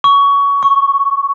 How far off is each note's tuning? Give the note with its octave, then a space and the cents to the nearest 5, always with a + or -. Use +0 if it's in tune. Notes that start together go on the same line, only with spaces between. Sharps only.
C#6 +20
C#6 -5